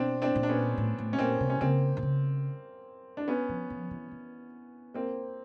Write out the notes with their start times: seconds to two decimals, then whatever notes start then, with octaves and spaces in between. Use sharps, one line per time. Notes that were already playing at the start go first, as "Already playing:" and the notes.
Already playing: B2 C4 D4
0.22 C4 D4
0.35 A#2
0.43 D4
0.49 B3 C#4
0.78 A2
0.98 A2
1.13 C#4
1.19 A#2 A#3 C4
1.40 C3
1.50 C#4
1.61 C#3 A#3 C4
1.97 C3
2.02 C#3
3.17 D4
3.28 B3 C#4
3.49 F3
3.70 F3
3.91 E3
4.11 E3
4.94 A#3 C4